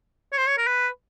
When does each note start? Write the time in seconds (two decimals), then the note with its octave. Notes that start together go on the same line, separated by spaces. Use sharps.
0.33 C#5
0.38 C5
0.47 C#5
0.58 A#4
0.67 B4